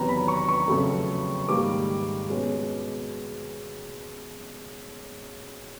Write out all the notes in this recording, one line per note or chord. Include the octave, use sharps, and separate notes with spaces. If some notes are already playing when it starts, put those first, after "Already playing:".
Already playing: E2 C3 D#3 F#3 A#5
B5
C#6
C#6
F2 C#3 F#3 A3
G#2 D#3 G3 A#3 D6
B2 G#3 C#4